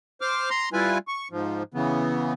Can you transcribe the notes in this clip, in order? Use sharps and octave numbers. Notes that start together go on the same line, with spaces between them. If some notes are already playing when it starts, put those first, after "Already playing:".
C5 D6 F6
A#5 C6
G3 E4 F4 B4 G#5
C#6
G#2 F3
C#3 E3 B3